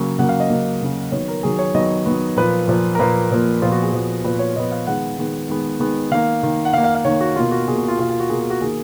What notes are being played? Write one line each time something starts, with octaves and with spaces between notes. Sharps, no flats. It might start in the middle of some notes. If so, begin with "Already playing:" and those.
Already playing: C#3 F#3 A#3
C#3 F#3 A#3 F#5
F5
D#5
C#3 F#3 A#3
C#3 F#3 A#3
D#3 F#3 B3 C#5
A#4
D#3 F#3 B3 G#4
C#5
D#3 F#3 B3 D#5
D#3 F#3 B3
A#2 F3 A#3 B4
A#2 F3 A#3
A#4
A#2 F3 A#3 B4
A#2 F3 A#3
A#2 F3 B3 F4
F#4
G#4
A#2 F3 B3
A#2 F3 B3 B4
C#5
A#2 F3 B3 D#5
F5
D#3 G#3 B3 F#5
D#3 G#3 B3
D#3 G#3 B3
D#3 G#3 B3
D#3 A#3 F5
D#3 A#3
F#5
D#3 A#3 F5
F5
F5
D#3 A#3 C#5
F#4
B2 A#3 F4
F#4
B2 A#3 G#4
F#4
F4
B2 A#3 F4
F4
F#4
B2 A#3 G#4
G#4
F#4
D#3 A#3 G#4